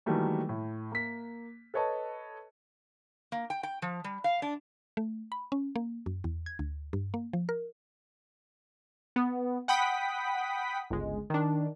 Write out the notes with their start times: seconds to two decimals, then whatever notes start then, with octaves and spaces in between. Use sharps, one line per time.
0.06 D#3 E3 F#3 G3 A3 A#3
0.49 A2
0.92 A#3 B6
1.74 A4 B4 C#5 D#5 A5
3.32 A#3
3.50 G5
3.63 G5
3.82 F3
4.04 G3
4.24 F5
4.42 D4
4.97 A3
5.32 B5
5.52 C#4
5.76 A#3
6.06 F#2
6.24 E2
6.46 G#6
6.59 D2
6.93 G2
7.14 A#3
7.33 F3
7.49 A#4
9.16 B3
9.68 F#5 G5 B5 D#6 B6
10.90 G1 C#2 G#3
11.30 D#3 D4